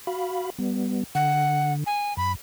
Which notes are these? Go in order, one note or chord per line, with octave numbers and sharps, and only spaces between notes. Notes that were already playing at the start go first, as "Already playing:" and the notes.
F#4 F5 B5
G3 B3
D3 F#5
G#5
F#2 B5